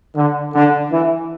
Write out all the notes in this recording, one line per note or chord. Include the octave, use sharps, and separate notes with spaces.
D3
D3
E3